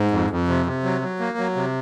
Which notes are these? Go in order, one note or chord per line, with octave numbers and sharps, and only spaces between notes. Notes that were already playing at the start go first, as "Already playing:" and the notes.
Already playing: G#2
F2
F2
C3
C3
F#3
F#3
A#3
F#3
C3